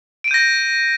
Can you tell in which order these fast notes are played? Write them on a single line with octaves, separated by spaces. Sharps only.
D7 D#7 G6 A#6